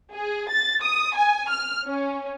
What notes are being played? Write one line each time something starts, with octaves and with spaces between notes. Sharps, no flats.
G#4
A6
D#6
G#5
F6
C#4